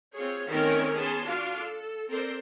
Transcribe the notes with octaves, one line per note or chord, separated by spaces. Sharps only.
C4 F4 G#4 C#5
D#3 A3 C4 C#4 A#4 D5
B3 C#4 G#4 A5 C6
D4 F4 F#4 F5
A4
C4 A4 A#4 C5 D5